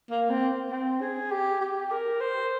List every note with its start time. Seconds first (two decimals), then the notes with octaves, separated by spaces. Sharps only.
0.11 A#3
0.30 C4
0.71 C4
1.01 G#4
1.31 G4
1.61 G4
1.91 A#4
2.21 C5